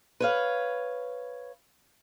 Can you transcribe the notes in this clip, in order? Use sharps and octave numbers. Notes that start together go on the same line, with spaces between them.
B4 C#5 F5